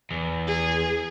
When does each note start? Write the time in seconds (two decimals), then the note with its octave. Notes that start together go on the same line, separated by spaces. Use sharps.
0.11 E2
0.47 G#4